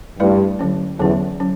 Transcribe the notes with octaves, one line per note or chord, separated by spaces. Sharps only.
G2 A3 E4 B4 D5
D3 F#3 C#4
E2 D3 F#3 C#4
F#3 C#4